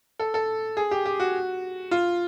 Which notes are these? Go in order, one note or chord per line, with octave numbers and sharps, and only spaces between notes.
A4
A4
G#4
G4
G4
F#4
F4